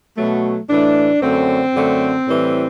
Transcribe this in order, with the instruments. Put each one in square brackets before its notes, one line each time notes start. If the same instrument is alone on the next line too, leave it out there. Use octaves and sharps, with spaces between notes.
[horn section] B2 F#3 A3
A2 E3 A3 D4
F#2 D3 A3 C4
F#2 D3 A3
A2 E3 G3